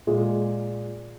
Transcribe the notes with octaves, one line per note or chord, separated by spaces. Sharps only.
A#2 G#3